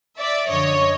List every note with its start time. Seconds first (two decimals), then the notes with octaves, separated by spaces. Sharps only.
0.19 D5 E5
0.48 F#2 D3 F3 C#5 D#5